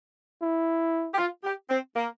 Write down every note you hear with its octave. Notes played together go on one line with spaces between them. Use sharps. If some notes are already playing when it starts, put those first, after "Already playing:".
E4
G4
F4
G4
C4
A#3